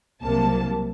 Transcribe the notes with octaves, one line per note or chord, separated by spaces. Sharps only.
C2 C3 F#3 A#3 A5